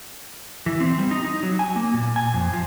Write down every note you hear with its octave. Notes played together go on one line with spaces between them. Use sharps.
E3
C4
G3
D#4
D#4
F#3
G#5
A#3
A#2
G#5
F2
F3